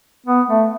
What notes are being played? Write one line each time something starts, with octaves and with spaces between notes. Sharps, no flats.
B3
A3